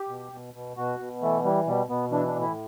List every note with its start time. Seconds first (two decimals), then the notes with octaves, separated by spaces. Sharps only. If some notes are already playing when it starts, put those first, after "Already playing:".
Already playing: G4
0.09 B2
0.32 B2
0.54 B2
0.77 B2 F#4
0.99 B2
1.22 E3 A3
1.44 E3 G3
1.67 B2 G3
1.89 B2 B3
2.11 E3 D4
2.27 D4
2.34 A2
2.42 E4